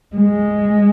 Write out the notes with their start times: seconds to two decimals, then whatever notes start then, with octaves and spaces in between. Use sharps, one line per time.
0.16 G#3